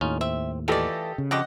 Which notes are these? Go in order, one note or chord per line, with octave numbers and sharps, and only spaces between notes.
D#2 A2 C#4 D#4 F4
C4 E5
E3 A3 F4 G4 A4 D5 D#5
C#3
F2 D3 F#4 G4 D#5 F#5